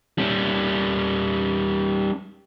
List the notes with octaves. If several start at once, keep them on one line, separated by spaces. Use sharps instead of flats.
G3 C#4